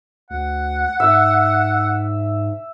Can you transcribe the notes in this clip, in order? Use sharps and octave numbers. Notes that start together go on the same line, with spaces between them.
D2 F#5
G#2 E5